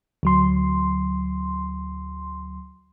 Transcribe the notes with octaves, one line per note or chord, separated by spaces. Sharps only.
D2 F#3 C6